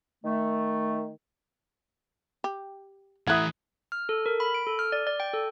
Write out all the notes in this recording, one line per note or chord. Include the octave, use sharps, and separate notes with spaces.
D#3 A3
G4
E3 A3 E4 F#5 D#6 F#6 G#6
F6
A4
A#4
B5
D7
A4
F6
D5
D5
G5
A4